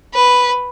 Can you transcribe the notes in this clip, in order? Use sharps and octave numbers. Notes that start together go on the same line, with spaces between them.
B4